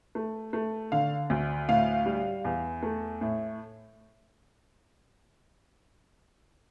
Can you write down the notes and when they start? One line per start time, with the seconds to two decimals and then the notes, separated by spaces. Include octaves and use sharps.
0.15 A3
0.53 A3
0.92 D3 F5
1.30 D2
1.69 A2 F5
2.06 G3
2.45 E2
2.83 A3
3.21 A2